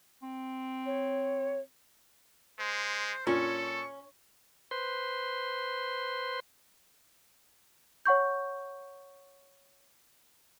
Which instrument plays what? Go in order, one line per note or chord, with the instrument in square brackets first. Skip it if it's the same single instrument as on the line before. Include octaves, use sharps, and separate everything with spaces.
[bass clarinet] C4
[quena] C#5
[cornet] G#3 [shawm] C5
[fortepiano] A#2 [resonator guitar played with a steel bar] C#4 [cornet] A4 [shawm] C#6
[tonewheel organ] B4 C5 C6
[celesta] C#5 F#5 C#6 G6